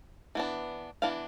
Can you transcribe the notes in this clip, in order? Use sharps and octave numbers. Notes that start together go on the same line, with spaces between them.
E3 B3 D4
E3 B3 D4 F5